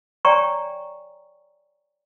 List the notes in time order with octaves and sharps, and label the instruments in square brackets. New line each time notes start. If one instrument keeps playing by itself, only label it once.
[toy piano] C#5 D5 G5 G#5 A#5 C#6